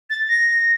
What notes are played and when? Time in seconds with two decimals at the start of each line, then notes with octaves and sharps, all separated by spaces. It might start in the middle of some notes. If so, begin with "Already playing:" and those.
0.10 A6
0.29 A#6